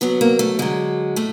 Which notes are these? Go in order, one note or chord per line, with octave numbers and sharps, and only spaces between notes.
D3 F#3 B3
A#3
A3
D3 F#3 G#3
A2 A3